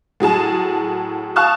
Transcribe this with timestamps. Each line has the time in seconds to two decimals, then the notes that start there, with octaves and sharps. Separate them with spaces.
0.20 A2 F#3 G#4 A5
1.36 F5 A5 C#6 D#6 F6 F#6